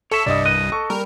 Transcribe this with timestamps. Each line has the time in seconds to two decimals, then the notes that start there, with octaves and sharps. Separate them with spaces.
0.12 A4 C#5 E5 C#6
0.26 C2 G2 D5 D#5 D#6
0.46 D#5 F#6 D#7
0.72 A4 C#6
0.90 G3 A#4